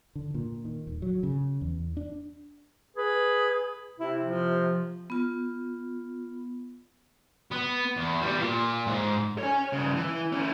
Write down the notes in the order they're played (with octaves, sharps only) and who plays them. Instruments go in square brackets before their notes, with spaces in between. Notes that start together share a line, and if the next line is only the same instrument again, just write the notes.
[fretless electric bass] D3
A#2
D#3
D#1
F#3
C#3
E2
D4
[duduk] G#4 [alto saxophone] B4
[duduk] C3 [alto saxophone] E4
[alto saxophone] F3
[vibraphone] B3 F4
[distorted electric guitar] B3
E2
E3 G3
A#2
G#2
[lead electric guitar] C#5 G#5
G2 C#3
E3
C#4 E4